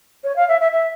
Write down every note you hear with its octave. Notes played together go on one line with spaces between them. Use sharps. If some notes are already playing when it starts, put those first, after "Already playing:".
C#5
F5
E5
E5
E5